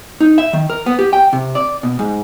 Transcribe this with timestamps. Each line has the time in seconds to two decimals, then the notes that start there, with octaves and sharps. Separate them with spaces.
0.20 D#4
0.38 E5
0.53 D#3
0.70 A#4
0.86 B3
0.99 G4
1.13 G5
1.33 C3
1.55 D5
1.83 B2
1.99 G#2